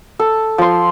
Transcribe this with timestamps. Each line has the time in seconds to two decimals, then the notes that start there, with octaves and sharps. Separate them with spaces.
0.19 A4
0.58 F3 C6